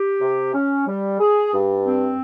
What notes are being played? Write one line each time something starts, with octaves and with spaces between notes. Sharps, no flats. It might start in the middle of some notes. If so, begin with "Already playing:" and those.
Already playing: G4
C3
C#4
G3
G#4
G2
C4